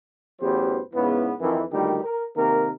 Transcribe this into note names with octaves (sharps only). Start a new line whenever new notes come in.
A1 E2 F#3 G4 B4 C5
E2 G#2 C#3 E3 B3
F2 D#3 E3
D2 G2 A#2 D#3 G3 G4
A#4
C3 D#3 A#3 A#4